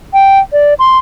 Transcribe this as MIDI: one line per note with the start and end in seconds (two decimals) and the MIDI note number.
0.13 0.39 79
0.53 0.74 74
0.79 0.98 84